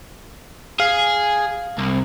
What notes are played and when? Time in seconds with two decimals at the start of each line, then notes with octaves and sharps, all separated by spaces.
0.80 G#4 F5
1.78 C2